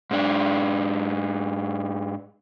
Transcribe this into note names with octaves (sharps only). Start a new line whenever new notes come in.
G#2 D4